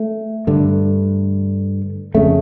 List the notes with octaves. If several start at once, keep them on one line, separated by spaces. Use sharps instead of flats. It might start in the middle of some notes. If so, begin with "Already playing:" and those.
Already playing: A3
G2 D3
F2 C#3 A3